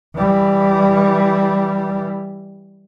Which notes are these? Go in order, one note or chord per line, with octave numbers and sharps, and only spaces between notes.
E3 G3